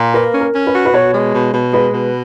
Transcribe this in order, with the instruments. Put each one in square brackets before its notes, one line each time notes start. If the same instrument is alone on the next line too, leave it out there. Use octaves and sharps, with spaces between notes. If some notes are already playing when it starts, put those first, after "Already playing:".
Already playing: [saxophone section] A#2
[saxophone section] A#3 [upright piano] B4
[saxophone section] C#4
[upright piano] A#4
[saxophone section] C#4
[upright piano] B4
[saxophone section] F#4
[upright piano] B4
[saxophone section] B2 [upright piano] C#5
[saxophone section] G#3
B2
B2
[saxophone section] G#3 [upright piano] B4
[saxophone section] B2